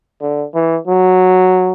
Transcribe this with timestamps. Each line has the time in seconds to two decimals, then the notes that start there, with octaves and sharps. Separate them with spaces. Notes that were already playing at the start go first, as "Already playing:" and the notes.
0.22 D3
0.54 E3
0.88 F#3